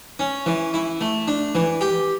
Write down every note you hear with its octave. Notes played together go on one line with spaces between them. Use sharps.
C#4
E3
E4
A3
D4
E3
G4